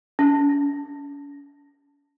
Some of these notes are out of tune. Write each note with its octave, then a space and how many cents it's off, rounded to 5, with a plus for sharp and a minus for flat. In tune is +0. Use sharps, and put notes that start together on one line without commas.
C#4 +40